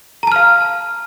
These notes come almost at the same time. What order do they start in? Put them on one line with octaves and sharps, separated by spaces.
A#5 A5 F6 F5